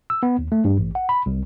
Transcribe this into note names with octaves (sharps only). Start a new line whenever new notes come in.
E6
B3
D#2
A3
G2
A1
F#5
B5
C2